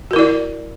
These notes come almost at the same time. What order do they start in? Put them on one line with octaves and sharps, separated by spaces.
F#4 A#4 E4 D5